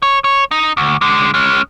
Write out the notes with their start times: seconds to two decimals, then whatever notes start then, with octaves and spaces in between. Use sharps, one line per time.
0.02 C#5
0.24 C#5
0.51 D#4
0.77 D2
1.01 D3 G#3
1.34 G#3 C#4